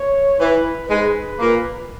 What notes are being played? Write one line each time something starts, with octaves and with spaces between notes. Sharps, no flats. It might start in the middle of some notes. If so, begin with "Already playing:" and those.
Already playing: C#5
E3 B4
G#2 G#3 B4
A#2 A#3